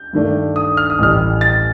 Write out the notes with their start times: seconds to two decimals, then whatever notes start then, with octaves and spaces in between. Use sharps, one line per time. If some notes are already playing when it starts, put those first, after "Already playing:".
Already playing: G6
0.13 G2 D#3 A3 D4
0.56 D#6
0.77 F6
0.90 D#6
0.99 A1 A2 G3 F6
1.41 A6